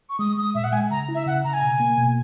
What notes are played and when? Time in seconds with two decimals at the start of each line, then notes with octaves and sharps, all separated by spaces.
0.09 C#6
0.19 G#3 D#6
0.37 G#3 D#6
0.55 A#2 E5
0.64 F#5
0.72 G#3 G#5
0.91 C#3 A#5
1.09 E4
1.15 E5
1.26 C#3 F#5
1.44 C#3 A#5
1.53 G#5
1.62 B2
1.80 A#3
1.98 B2